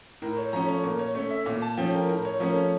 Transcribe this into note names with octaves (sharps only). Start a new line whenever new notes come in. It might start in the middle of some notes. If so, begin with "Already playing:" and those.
A2 A#4
C#5
F3 A3 C#4 A#5
C#5
A#2 A#4
C#5
A3 C#4 C#5
E5
A#2
A5
F3 A3 C#4 G5
A#4
A2 A#4
C#5
F3 A3 C#4 A#4
C#5